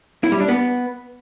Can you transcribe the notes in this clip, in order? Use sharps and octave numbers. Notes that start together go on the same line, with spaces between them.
E4
G3
D4
B3